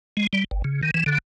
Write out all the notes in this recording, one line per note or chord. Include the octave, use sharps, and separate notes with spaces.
G#3
G3
G1
C#3
D#3
E3
D3